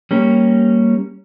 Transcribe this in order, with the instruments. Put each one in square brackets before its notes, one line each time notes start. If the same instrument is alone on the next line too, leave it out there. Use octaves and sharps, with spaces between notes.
[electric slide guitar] G3 A#3 C#4